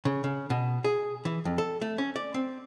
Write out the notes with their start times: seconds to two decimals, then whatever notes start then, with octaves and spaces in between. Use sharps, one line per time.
0.05 C#3
0.24 C#3
0.50 B2
0.84 G#4
1.25 E3
1.45 F2
1.58 A4
1.81 A3
1.98 C#4
2.16 D5
2.34 C4